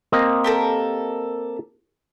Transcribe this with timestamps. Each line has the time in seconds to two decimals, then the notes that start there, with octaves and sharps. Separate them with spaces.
0.12 A#3 C4 D#5
0.44 G4 A4 A#4